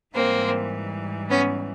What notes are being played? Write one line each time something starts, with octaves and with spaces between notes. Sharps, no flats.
G#2 E3 G3 A#3 C4
B3 C#4